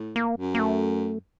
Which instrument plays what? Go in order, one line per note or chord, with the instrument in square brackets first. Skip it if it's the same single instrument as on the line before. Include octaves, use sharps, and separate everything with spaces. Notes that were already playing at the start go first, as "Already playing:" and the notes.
Already playing: [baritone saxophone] A2
[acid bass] A#3
[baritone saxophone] F#2
[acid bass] A#3
A3